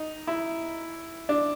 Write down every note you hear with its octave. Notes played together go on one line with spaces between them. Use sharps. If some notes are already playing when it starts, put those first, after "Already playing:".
Already playing: D#4
E4
D4